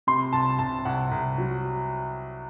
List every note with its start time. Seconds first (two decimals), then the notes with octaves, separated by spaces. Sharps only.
0.07 C3 C6
0.33 C2 A5
0.59 C2 A5
0.85 C2 F#5
1.11 C2
1.38 F#3